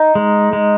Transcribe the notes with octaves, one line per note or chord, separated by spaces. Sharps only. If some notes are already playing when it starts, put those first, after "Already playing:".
Already playing: D#4
G#3
G#3